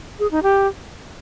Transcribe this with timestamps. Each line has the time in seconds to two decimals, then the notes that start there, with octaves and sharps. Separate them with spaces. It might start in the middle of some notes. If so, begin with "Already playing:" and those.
0.19 G#4
0.31 D#4
0.43 G4